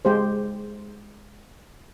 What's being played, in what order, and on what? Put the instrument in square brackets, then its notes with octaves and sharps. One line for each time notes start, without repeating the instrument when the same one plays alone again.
[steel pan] G#3 G4 C5